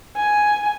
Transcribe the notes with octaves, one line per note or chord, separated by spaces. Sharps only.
G#5